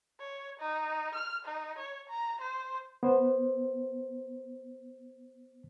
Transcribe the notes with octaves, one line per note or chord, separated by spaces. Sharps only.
C#5
D#4
F6
D#4
C#5
A#5
C5
B3 C5